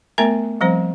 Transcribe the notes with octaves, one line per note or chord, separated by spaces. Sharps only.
A3 B3 A#4 E5 A#5
F3 G3 C4 C5